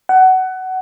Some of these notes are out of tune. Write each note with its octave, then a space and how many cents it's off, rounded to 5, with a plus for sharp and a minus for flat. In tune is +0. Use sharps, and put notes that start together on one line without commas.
F#5 +20